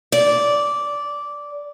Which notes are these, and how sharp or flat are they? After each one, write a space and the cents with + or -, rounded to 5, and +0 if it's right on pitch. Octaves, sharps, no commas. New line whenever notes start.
D5 -10